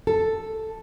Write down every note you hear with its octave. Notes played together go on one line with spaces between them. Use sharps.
A4